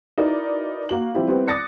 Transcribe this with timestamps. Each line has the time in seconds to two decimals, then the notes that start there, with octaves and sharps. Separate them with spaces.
0.18 D#4 E4 F#4 A#4 B4 D5
0.89 A#3 F#4 F#7
1.14 F3 G3 C4 E4 G4
1.28 G3 B3 C4 E4
1.48 D6 D#6 F#6 A6 A#6 C#7